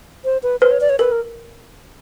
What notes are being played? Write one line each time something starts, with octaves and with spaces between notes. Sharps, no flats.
C5
B4
B4 C5
C#5
D5
C#5
A#4 B4
A#4